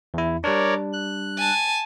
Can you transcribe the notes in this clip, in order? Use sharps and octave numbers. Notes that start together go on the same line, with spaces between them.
E2 E4
G3 D4 A#4 C#5 D5
F#6
G#5 A5